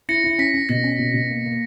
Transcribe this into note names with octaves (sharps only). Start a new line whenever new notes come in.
E4 A#6 C#7
E4
C#4 B6
C#4
B2 A#6
C#4
B2
B2
A#3
A#3